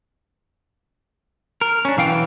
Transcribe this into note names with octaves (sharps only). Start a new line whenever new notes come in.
A#4
C#4 D4
B1 E3 F5 G5